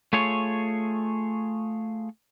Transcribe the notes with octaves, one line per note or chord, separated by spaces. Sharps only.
A3 F4 G#4 C#5